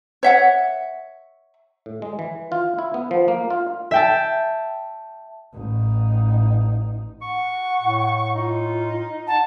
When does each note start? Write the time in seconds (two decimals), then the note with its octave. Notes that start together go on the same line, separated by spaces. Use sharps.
0.23 C#5 E5 F#5
1.86 A2
2.02 G#3
2.19 E3
2.52 F4
2.79 E4
2.94 B3
3.11 F3
3.28 A#3
3.50 F4
3.91 E5 G5 A5
5.54 A1 D#4
7.22 F#5 C#6
7.81 A2
8.34 D#4 F4
9.27 F#5 A5